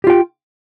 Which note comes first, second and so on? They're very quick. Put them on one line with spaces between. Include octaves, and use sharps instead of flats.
G4 F4 G5